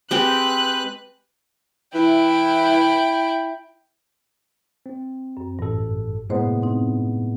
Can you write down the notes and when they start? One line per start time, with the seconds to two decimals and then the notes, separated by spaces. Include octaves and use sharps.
0.11 G#3 C4 G4 B4 F#6
1.95 E3 E4 G5
4.86 C4
5.37 F#2
5.59 A1 G2 A4
6.30 A2 C3 G#3 A#3 B3 C5
6.62 C4 D#4